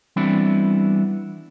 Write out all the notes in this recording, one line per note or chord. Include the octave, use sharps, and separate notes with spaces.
E3 G3 B3 C4 D4 E4